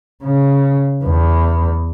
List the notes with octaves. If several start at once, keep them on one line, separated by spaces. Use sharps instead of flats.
C#3
E2